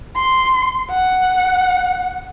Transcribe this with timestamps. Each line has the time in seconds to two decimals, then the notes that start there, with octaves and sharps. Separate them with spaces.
0.16 C6
0.90 F#5